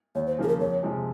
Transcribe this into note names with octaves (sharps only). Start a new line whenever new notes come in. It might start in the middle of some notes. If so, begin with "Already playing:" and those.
D#2 C#5
C5
C#3 F3 A#3 G#4
A#4
F2 C#5
C3 F3 G#3